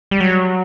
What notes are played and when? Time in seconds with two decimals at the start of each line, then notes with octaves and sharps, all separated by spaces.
0.11 G3
0.20 F#3